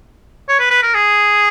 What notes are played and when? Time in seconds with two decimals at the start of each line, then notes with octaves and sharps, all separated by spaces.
0.49 C#5
0.60 B4
0.71 B4
0.83 A#4
0.94 G#4